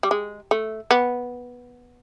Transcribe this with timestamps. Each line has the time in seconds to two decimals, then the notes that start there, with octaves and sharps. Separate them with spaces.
0.03 G3
0.11 G#3
0.51 A3
0.91 B3